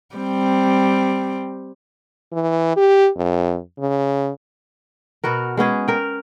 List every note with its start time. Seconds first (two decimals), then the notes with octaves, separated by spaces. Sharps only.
0.15 G3 C4
2.33 E3
2.76 G4
3.17 F2
3.79 C#3
5.24 B2 B3 F#4 A#4
5.57 G#3 B3 C#4 G#4
5.88 A#4 G5